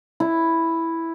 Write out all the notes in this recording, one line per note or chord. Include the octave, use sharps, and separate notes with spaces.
E4